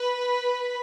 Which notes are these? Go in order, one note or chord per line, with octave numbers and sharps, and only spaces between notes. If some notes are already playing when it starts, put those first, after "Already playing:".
Already playing: B4 B5